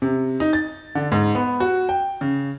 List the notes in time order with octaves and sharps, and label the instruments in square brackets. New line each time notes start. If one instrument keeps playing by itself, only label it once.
[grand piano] C3
D#4
A6
D3
G#2
B3
F#4
G5
C#3